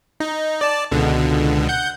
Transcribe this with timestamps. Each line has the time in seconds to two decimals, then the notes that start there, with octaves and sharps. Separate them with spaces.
0.20 D#4
0.61 D5 A5
0.92 C#2 B2 D3
1.69 F#5 G6